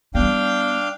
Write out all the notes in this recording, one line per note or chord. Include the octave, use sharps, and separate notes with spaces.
G3 B3 D4 F5 G5